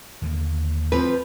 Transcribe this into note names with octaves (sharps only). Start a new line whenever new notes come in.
D#2 D3 A#3
F3 C4 B4